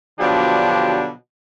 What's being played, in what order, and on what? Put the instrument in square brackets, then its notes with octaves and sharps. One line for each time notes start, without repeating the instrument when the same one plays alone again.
[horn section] B2 D3 F3 F#3 D4 G4